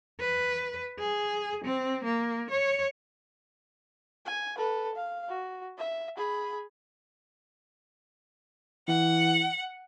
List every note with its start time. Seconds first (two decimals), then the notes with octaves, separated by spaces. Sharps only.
0.20 B4
0.99 G#4
1.65 C4
2.04 A#3
2.50 C#5
4.25 G#5
4.57 A4 B4
4.95 F5
5.29 F#4
5.78 E5
6.17 G#4 B5
8.88 E3 F#5